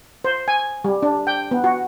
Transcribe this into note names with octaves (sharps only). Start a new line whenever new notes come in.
C5
G#5
G3
D4
G5
B3
F#4